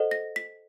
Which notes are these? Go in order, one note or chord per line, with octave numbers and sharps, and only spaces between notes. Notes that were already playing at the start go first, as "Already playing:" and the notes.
Already playing: A4 C5 D#5 F#5
A#6
B6